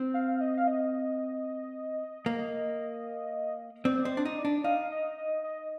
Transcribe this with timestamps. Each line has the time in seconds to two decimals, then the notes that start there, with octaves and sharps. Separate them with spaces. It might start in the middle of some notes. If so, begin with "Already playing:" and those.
Already playing: C4
0.14 F5
0.41 D#5
0.57 F5
0.67 D#5
2.26 A#3
3.85 C4 D5
4.04 C4 D#5
4.12 D5
4.17 D4
4.25 D#4
4.38 D5
4.45 D4
4.64 D#4 F5
4.92 D#5
5.18 D#5
5.44 D#5